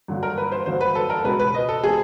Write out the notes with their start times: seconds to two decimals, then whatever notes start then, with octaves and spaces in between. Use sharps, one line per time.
0.08 G2 D3 F#3 A#3
0.23 A#4
0.38 B4
0.52 C5
0.66 G2 D3 F#3 A#3 C5
0.81 B4
0.95 A4
1.10 A#4
1.24 C#2 B2 G#3 C4 B4
1.40 B4
1.54 D#5
1.69 A4
1.84 B2 G#3 C4 G#4